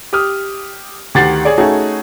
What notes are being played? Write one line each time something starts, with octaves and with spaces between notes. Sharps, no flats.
G4 D#6 F6
D2 D#3 G4 F#5 A6 C7
G#4 C#5 D5
A3 C#4 D#4 F#4 G#4